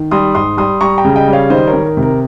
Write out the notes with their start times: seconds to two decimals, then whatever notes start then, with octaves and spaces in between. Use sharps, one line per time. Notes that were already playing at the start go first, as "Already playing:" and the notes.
Already playing: D#3
0.11 G3 C6 D#6
0.35 G#2 C6 D#6
0.57 G3 C6 D#6
0.81 G3 A#5 C#6
0.98 G5 A#5
1.04 C#3
1.16 D#5 G5
1.27 G3
1.33 C#5 F5
1.50 D#3 C5 D#5
1.67 A#4 C#5
1.73 D#3
1.85 A#4
1.97 C3
2.03 A#4